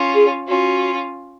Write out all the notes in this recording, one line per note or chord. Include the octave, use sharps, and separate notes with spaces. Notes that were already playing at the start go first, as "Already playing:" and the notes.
Already playing: C#4 F4
G#4
C#4 F4 F#4